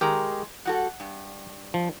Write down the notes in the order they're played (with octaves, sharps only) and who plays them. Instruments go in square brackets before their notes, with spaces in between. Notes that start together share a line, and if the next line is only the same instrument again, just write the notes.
[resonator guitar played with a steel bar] D#3 G#3 A#5 [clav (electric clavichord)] G4 A#4
[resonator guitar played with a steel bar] G3 F#4 A4 [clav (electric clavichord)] F#5
[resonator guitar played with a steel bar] G2
[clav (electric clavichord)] F3